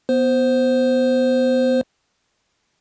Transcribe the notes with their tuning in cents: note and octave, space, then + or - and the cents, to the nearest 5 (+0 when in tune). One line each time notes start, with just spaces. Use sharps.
B3 +0 C5 -5